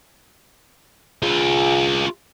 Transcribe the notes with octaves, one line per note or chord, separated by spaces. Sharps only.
F4 G#4